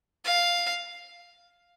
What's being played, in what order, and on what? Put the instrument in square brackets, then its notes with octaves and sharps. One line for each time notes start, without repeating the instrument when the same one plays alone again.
[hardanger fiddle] F5